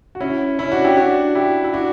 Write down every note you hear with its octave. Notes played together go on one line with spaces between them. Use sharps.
F#4
C#4 E4
C#4 E4
D4 F#4
E4 G4
D4 F#4
E4 G4
E4
D4 F#4